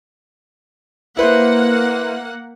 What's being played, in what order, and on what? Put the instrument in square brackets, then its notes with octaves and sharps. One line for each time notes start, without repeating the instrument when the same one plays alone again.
[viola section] A#3 F#5 [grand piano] E4 B4 C5